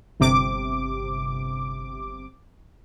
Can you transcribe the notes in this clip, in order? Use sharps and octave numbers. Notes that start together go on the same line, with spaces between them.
G1 C3 D6